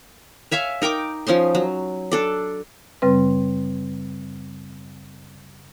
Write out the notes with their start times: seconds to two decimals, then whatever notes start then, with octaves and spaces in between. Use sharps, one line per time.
0.51 C#5 E5 F5 G#5
0.82 D#4 A#4 G5 D6
1.27 F3 C#4 D#4 C6
1.55 F#3
2.11 D4 A4 D5
3.02 F#2 C#3 G3 C4 B4